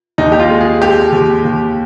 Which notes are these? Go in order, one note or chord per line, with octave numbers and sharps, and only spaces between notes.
D#2 D#4
G4
F4
G#3
G#4
G#3 G4
D#2
D#2